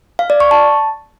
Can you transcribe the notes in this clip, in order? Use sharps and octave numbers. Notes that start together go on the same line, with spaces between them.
F5
D5
C#6
A5